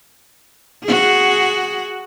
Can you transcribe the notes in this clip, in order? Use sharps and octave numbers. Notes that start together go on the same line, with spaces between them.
F#4 G#4